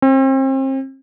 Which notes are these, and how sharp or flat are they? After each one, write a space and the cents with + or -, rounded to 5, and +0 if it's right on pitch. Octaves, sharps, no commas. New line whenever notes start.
C4 +35